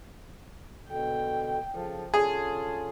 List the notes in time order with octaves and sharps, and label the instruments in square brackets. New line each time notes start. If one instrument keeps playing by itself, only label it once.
[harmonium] B2 D3 [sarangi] G5
[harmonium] C#3 A4 [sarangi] F3
[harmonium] D3 C#4 F4 [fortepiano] G#4 [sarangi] A5